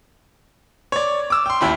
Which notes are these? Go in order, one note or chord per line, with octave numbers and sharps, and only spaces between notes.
C#5 D5
D6 E6
G5 C6
A1 D#2 E4 G5 B5